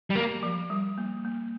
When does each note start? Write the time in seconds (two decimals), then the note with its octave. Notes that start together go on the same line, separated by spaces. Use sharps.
0.10 G3
0.15 A#3 G4
0.43 F3
0.70 G3
0.98 A#3
1.25 A#3